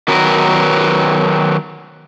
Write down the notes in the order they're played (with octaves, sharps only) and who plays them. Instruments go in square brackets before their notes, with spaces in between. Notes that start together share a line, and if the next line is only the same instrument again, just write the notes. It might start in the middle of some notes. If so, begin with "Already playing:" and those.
[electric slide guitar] D#3 F#3 B3 A#4 B4